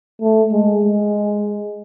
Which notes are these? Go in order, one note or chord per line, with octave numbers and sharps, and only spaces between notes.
A3
G#3
G#3